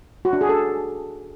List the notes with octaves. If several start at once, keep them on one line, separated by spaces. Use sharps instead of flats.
F#4
D4
G#4
A4